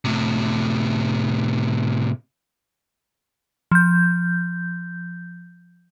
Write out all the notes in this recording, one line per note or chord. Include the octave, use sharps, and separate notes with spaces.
A2 C3
F3 G6